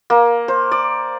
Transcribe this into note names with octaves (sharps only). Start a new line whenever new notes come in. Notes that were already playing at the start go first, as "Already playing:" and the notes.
A#3
C5
D5